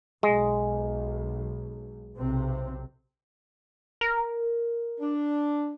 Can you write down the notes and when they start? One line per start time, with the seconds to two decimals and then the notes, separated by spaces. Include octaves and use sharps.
0.23 B1 G#3
2.16 B1 C3 C4
4.01 A#4
5.00 D4